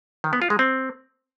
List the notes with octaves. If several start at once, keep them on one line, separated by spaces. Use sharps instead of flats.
D#3
B3
F4
G#3
C4